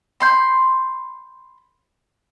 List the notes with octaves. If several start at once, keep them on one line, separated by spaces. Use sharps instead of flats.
B5 C6 G6